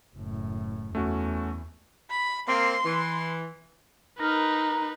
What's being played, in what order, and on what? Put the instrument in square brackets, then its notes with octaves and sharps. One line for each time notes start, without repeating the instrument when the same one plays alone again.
[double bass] F#1 A2
[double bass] E2 [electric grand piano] A3 C#4 F#4
[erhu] B5
[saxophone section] A#3 C4 [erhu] C6
[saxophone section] E3
[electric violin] D#4 B4 [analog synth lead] A#4